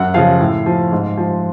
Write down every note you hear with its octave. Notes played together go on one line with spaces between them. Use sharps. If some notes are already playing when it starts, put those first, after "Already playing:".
Already playing: F#2 F#5
C#3 F3 F5
A2
F3
G#2
F3